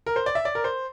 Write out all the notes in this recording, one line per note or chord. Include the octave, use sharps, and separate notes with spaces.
A#4
C5
D5
E5
D5
A#4
C5